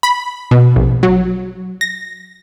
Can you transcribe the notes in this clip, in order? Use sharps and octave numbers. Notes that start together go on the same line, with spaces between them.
B5
B2
A#1
F#3
A#6